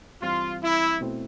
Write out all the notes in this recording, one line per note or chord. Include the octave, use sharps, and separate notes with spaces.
G2 E3 G3 C4 F4
E4
B2 A3 C4 E4